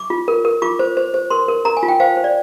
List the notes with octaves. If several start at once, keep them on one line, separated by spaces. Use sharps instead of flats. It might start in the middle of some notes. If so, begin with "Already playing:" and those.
Already playing: D6
F4
A#4
A#4
F4 D6
C5
C5
C5
A#4 C6
A#4
A#4 A#5
G#5
F4
G5
C5 F5
C5
D5